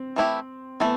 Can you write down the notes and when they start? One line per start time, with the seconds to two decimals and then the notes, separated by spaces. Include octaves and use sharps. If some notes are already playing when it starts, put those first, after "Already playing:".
Already playing: C4
0.16 E3 A3 E4 G4
0.80 E3 A3 B3